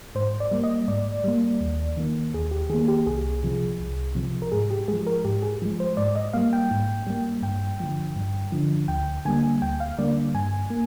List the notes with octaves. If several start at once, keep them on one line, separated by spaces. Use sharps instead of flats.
G#2 C5
D5
G3 A#3
D#5
G#2 D5
G3 A#3
D#2
D#3 A#3
D#2 G#4
G4
D#3 A#3 G#4
G4
C2 G#4
C3 F3
C2
C3 F3
A#4
G#2 G#4
G4
F3 G#3 G#4
A#4
G#2 G4
G#4
F3 G#3
C5
G#2 D5
D#5
G3 A#3 F5
G5
G#2
G3 A#3
G2 G5
D3 F3
G2
D3 F3
D2 G5
D3 G3 A#3 G#5
D2 G5
F5
D3 G3 A#3 D5
G2 G#5
A#3